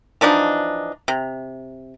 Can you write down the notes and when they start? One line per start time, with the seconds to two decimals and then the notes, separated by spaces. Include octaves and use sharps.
0.21 E3 F3 D4 D#4
1.08 C3